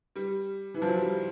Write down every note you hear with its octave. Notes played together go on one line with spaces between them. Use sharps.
G3
E3
F3
F#3
G3